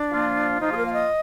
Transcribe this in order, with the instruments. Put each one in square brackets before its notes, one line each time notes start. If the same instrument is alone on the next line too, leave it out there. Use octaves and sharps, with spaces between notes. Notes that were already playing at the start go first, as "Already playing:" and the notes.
Already playing: [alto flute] D4
[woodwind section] F3 A#3 F4
[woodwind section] F3 A#3 F4 [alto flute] D#4
[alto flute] G#4
A#4
F5
D#5